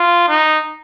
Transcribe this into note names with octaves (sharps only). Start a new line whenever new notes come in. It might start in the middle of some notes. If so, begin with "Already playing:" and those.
Already playing: F4
D#4